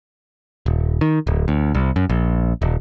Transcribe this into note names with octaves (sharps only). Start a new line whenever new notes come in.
D#1
D#3
D1
D2
C2
F#2
A#1
D#1